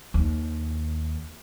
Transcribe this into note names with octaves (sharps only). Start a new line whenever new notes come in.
D#2